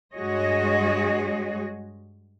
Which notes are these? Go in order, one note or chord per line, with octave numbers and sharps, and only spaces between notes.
G2 G#3 F#4 G#4 C#5 D#5